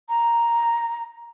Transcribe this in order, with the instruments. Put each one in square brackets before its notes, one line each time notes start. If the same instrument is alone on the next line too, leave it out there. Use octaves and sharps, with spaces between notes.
[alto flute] A#5